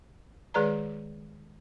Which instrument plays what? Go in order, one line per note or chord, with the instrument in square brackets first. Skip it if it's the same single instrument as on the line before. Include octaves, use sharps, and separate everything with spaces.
[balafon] D#3 G#3 G#4 B4 D5 A#5